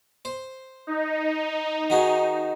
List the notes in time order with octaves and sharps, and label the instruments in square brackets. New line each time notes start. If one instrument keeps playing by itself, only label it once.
[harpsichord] C5
[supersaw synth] D#4
[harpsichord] D#3 F#4 G#4